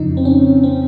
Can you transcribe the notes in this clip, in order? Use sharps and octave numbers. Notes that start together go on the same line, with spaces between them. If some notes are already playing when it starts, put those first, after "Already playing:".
Already playing: F2 C#3 F3 D#4
C4
C#4
C4